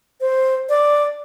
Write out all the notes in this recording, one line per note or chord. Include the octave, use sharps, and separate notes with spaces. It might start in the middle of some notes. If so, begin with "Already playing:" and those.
C5
D5